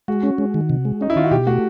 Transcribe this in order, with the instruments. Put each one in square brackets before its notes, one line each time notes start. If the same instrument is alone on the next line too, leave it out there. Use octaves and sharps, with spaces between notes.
[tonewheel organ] G#3 [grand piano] F#4
[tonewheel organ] C#4
G#3
D#3
C3
G#3
[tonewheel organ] C#4 [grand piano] D#4
[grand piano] E4
[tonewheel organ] D#3 [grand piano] F4
[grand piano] F#4
[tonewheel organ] B2 [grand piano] G4
[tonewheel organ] A3 [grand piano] F#4